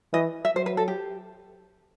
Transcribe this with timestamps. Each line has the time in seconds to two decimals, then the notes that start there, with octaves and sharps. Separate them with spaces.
0.13 E3 D#5
0.45 E5
0.55 F#3 C5
0.66 B4
0.77 A4
0.88 G4